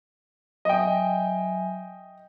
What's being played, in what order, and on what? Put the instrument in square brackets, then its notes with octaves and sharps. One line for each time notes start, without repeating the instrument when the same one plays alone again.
[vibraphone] F#3 E5 G#5 [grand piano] D#5 G5